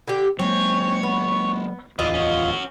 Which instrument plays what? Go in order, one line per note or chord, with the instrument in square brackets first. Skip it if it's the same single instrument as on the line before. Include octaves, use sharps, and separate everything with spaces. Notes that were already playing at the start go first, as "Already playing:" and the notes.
[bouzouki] D3 G4
[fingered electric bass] F#3 G#3 A#3 [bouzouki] C4 C#4 [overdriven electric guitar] C#5
[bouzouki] B3
[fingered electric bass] D1 E2 [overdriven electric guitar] D3 E3 [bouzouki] F4 D#5
[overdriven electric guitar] C#4 F#4